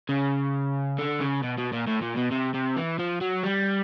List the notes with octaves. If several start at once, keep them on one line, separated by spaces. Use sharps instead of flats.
C#3
D3
C#3
B2
B2
A#2
A2
A#2
B2
C3
C3
E3
F3
F#3
G3